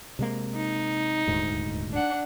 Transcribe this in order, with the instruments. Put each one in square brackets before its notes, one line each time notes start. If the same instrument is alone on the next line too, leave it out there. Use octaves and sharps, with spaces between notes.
[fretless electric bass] C3 G#3 A#3
[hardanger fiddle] D#4
[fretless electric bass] D#1 D2 G#2
[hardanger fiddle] D4 F#5